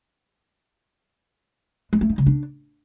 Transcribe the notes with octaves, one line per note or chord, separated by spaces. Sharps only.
G#3
A3
D#4
C#3
D4